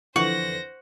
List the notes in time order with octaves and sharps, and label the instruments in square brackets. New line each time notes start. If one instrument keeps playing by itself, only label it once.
[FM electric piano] F2 D3 E3 [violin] C5 A#6 [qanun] F#5 [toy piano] C#6